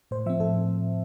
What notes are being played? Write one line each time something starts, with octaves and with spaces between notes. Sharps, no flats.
A2 C5
F3 C4 E5
A2 A4